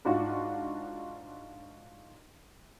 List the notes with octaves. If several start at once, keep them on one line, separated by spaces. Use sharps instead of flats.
G#2 D4 F4 F#4